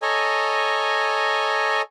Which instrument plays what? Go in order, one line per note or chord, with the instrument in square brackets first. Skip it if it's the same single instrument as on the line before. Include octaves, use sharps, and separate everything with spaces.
[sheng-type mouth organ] A4 C#5 D#5 G#5 A#5